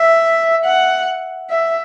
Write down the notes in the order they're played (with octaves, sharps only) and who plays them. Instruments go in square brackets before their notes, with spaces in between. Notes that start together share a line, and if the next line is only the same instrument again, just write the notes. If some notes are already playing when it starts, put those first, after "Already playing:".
Already playing: [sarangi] E5
F#5
E5